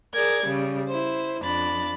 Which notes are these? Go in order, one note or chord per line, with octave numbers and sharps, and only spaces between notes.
G#4 A#4 D5 G#6
C#3 G3
E4 C5
F2 D4 B5 A6